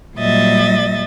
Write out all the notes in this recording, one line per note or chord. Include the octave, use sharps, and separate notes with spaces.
A#2 F#3 G3 D#5 E5 A6